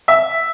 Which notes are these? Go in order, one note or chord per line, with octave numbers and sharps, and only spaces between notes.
E5